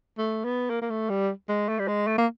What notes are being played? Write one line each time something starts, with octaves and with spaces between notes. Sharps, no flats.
A3
B3
A#3
A#3
A3
G3
G#3
A3
G3
G#3
A3
A#3